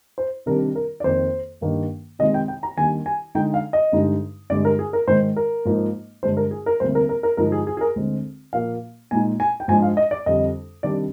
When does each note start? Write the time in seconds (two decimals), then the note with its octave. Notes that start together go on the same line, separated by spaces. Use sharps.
0.18 C5
0.46 C3 D#3 G3 D4 A#4
0.75 A#4
1.00 D5
1.04 F2 D#3 A#3 C5
1.61 G2 D#3 A#3 D4
2.19 C3 D#3 G#3 D#4 D#5
2.34 G5
2.48 G5
2.63 A#5
2.77 D#2 D#3 G3 D4 G#5
3.06 G#5
3.35 D3 G#3 D#4 G5
3.54 F5
3.73 D#5
3.92 G2 D3 G#3 D#4
4.50 G2 D3 G#3 D5
4.65 A#4
4.79 G#4
4.93 A#4
5.07 G#2 D#3 G#3 C5
5.36 A#4
5.65 G#2 F3 A#3 D#4
6.23 G2 D3 G#3 D4 C5
6.37 A#4
6.51 G#4
6.66 A#4
6.80 D2 C3 G3 A#3 C5
6.95 A#4
7.09 A#4
7.23 A#4
7.37 G2 D3 F3 G#3 D#4 A#4
7.52 G#4
7.67 G#4
7.77 G#4
7.81 A#4
7.96 D2 D3 G#3 C4
8.53 A#2 F3 A#3 F5
9.11 A#2 G#3 D#4 G#5
9.40 G#5
9.60 G5
9.68 G#2 F3 G#3 D4 G#5
9.82 F5
9.97 D#5
10.11 D5
10.26 F2 D3 G3 D4 D#5
10.83 C3 D#3 G3 D4 D5